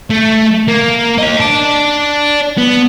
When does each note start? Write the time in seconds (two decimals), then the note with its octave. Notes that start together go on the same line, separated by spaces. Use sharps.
0.10 A3
0.68 A#3
1.18 D#5 F5
1.40 D5 A5
2.58 B3